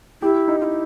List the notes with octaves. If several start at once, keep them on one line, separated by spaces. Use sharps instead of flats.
E4 G4
D#4
F4
E4